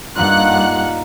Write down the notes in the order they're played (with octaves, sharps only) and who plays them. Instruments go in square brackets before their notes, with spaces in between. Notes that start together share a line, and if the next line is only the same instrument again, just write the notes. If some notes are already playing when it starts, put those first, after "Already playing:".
[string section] G2 F#5 F#6 [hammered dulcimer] A#3 D#4 F4